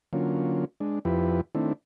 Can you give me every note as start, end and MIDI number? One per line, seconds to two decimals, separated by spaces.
0.13 0.65 50
0.13 0.65 54
0.13 0.65 58
0.13 0.65 61
0.13 0.65 65
0.80 0.99 56
0.80 0.99 62
1.05 1.41 41
1.05 1.41 53
1.05 1.41 64
1.05 1.41 67
1.05 1.41 71
1.55 1.73 51
1.55 1.73 57
1.55 1.73 60
1.55 1.73 62
1.55 1.73 64